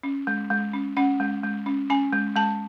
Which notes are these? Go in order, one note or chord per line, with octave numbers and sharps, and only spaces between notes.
C#4
G#3
G#3
C#4
C#4 F#5
G#3
G#3
C#4
C#4 G#5
G#3
G#3 A5